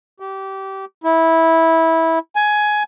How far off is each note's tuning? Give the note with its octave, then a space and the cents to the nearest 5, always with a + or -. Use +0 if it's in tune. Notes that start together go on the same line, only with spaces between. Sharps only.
G4 -25
E4 -15
G#5 +15